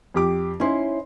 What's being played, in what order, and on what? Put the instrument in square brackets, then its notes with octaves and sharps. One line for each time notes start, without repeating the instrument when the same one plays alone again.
[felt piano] F2 G4 D6
[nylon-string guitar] C#4 E4 C5 [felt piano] D#4 C6